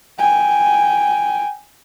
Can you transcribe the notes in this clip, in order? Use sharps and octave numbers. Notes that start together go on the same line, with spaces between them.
G5 G#5